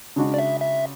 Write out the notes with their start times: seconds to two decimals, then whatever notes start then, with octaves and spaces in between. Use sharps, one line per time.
0.16 C#3 G#3 D4 F#4
0.34 D5
0.38 E5
0.61 E5